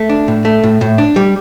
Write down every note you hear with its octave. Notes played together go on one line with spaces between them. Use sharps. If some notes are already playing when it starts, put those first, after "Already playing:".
Already playing: A3
D4
A2
A3
A2
A2
D4
G3